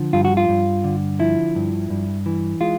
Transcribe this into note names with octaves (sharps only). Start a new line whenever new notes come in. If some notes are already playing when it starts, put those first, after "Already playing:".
Already playing: D3 F3
G2 F4
F#4
F4
G2
D3
F3 E4
G2
G2
E3
G#3 F4